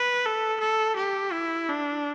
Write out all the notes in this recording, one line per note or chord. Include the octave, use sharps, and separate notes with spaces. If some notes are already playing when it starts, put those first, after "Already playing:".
Already playing: B4
A4
A4
G4
E4
D4